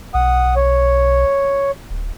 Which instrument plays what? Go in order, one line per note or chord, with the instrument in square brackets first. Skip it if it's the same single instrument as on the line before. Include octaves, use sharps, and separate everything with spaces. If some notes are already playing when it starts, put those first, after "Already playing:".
[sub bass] B1 [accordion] F#5 D#6
[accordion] C#5
[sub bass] D1